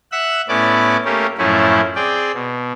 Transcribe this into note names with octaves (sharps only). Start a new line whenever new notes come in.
E5 F#5 E6 F#6
A2 B3 C#4 E4 D5 D6
A3 A#3 C#4 G4 A#4
F#2 A2 F3 A3 C#4 E4
C4 G#4 D5 G5
B2